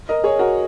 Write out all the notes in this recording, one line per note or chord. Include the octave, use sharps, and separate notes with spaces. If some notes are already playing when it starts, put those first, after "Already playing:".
A#4 D#5
G#4 C#5
F#4 A#4